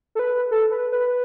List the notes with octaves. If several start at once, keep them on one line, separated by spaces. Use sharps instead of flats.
A4
B4
A4
B4
B4